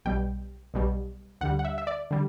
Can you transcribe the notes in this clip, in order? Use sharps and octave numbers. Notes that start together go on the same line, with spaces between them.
B1 B2 G3 G5
B1 B2 G3
D2 D3 G3 F#5
F#5
E5
E5
D5
D3 G3